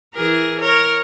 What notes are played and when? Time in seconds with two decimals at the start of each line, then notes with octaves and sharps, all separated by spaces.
0.15 E3 G#4 A#4
0.60 A#4 C#5